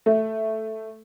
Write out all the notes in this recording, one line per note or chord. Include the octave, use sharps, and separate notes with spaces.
A3